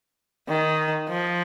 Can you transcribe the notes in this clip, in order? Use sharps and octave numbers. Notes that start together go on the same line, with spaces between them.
D#3
F3